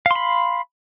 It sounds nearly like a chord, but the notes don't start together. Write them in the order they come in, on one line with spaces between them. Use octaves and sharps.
F5 C6 B5